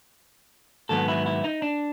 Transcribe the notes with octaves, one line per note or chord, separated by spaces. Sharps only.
G#2 D#3 F#3 B3 A4
E4
E4
D#4
D4